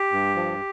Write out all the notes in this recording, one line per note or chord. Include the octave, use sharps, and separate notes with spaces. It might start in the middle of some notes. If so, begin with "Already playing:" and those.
Already playing: G4
G2
F3